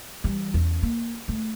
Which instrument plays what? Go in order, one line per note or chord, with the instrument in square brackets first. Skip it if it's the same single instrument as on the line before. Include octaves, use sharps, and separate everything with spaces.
[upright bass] E3 G3
E2 C#4
A#3
A3